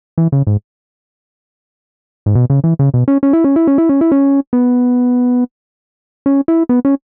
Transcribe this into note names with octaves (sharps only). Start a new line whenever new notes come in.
E3
C#3
G#2
G#2
B2
C#3
E3
C#3
B2
C#4
C#4
E4
C#4
E4
C#4
E4
C#4
E4
C#4
B3
C#4
E4
B3
C#4